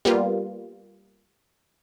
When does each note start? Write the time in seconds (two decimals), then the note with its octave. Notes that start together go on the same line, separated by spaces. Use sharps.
0.05 G3 A#3 B3 F4